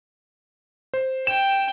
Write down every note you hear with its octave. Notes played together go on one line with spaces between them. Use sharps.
C5
G5 E7